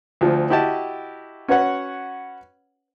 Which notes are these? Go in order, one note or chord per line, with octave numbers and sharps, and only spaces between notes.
D2 F3 F4
E4 F#4 G4 D#5 A5
C#4 F#4 B4 C#5 F#5